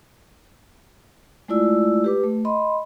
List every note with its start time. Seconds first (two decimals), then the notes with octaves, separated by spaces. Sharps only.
1.48 G#3 A3 E4 F4 D5 E6
2.04 G4 B4 D6
2.24 A3
2.45 D#5 B5 C6